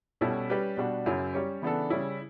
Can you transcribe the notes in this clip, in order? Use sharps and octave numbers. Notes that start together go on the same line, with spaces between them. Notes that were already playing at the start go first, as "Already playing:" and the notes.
B2 G3 C#4 E4 A4
G3 C#4 G4 B4
B2 G3 D4 F#4
F#2 C#3 F#3 C#4 E4
G3 C#4 G4 C#5
C#3 E3 B3 D4 A4
C#3 G3 C#4 E4